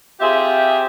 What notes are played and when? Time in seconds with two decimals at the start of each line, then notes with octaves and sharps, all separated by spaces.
0.20 C4 F4 G4 G#4 E5